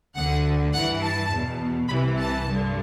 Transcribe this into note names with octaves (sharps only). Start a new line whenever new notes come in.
D2 D3 F#5
G2 E3 F#5
A5
E2 B2
C2 C3 E3 B5
A5
G2 D3